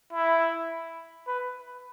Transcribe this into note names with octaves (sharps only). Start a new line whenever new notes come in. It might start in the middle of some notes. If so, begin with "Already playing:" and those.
E4
B4